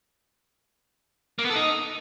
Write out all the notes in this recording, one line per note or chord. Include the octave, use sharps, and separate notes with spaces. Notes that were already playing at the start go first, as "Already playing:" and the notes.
A#3
B3
A4
D#4